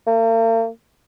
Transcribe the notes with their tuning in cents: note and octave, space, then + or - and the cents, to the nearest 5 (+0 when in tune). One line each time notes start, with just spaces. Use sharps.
A#3 -45